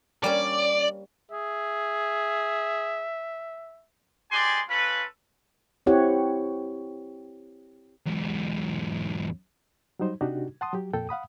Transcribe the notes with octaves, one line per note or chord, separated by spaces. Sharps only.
G3 A#3 C#4 D5
G#4 E5
G#3 G4 D5 G#5 C6
C#4 F4 A4 B4
C4 E4 G4 C#5 F#5
E2 G#2
F#3 G3 D#4 C5
C3 D4 D#4 F#4 G4
F#5 A5 C6 D#6
F#3 G4
F2 A#2 A4 G5
F5 F#5 B5 D#6